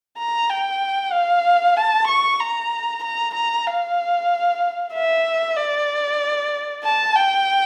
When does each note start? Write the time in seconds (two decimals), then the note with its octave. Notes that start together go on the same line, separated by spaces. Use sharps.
0.18 A#5
0.49 G5
1.13 F5
1.76 A5
2.08 C#6
2.40 A#5
3.04 A#5
3.34 A#5
3.66 F5
4.94 E5
5.57 D5
6.84 A5
7.16 G5